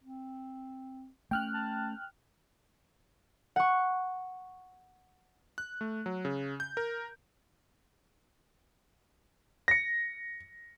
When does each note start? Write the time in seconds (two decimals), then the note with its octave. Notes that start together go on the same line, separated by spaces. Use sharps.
0.04 C4
1.31 A3 A#3 C#4 G5 F6 F#6
1.54 A5
3.56 F#5 C#6
5.58 F#6
5.81 A3
6.06 F#3
6.25 C#3
6.60 G6
6.77 A#4
9.68 A#6 C#7